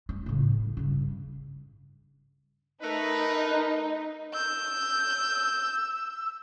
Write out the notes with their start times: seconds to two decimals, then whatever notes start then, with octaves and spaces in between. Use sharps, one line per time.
0.09 G#3
0.26 A2 C#3
0.50 E4
0.77 G2 C#3
2.82 A3 D#4 A#4 B4
4.34 E6 G6